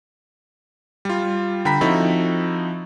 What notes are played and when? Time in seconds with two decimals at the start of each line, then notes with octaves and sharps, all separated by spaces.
1.05 G3 F4
1.65 D3 G5 A#5 B5 B6
1.81 F3 C4 D#4 E4 F#4 A4